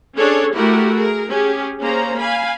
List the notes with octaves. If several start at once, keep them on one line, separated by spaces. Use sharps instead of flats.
C#4 D4 G#4 A4 C#5
A3 E4 F#4 G4 A#4
G#4 A#4
C#4 G4 G#4
A#3 C#4 G#4 C5 A#5
F5 G#5 B5